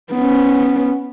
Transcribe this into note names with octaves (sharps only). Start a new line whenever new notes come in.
B3 C#4